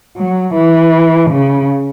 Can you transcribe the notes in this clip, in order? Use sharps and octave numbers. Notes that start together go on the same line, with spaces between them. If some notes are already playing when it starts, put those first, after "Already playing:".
F#3
E3
C#3